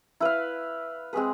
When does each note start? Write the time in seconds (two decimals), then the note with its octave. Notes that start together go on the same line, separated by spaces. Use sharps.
0.20 E4 B4 F5
1.13 G#3 C4 G#4 B4